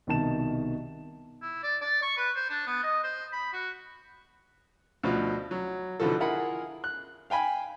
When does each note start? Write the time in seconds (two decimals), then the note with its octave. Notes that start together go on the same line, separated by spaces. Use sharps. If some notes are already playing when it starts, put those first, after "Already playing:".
0.07 C2 B2 D#3 A5 E7
1.42 E4
1.63 D5
1.81 D5
2.02 C#6
2.17 B4
2.36 C5
2.50 D4
2.67 B3
2.83 D#5
3.04 C5
3.32 B5
3.53 F#4
5.03 D2 B2 F3 F#4
5.51 F#3
6.00 B2 D3 E3 F3 F#4 A4
6.20 E4 F4 G#4 A#4 F#5 B5
6.84 F#6
7.30 F5 G5 G#5 B5